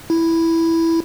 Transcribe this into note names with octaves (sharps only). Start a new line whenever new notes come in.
E4